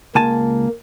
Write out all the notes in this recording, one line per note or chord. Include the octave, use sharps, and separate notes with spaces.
C#2 A#3 G#5 A5